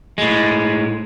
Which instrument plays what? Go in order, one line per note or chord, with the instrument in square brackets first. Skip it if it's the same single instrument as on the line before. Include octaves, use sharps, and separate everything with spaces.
[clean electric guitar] A2 G#3